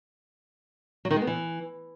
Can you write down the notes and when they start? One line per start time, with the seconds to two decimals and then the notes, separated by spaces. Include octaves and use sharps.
1.05 F#3
1.11 D#3
1.16 G#3
1.22 B3
1.27 E3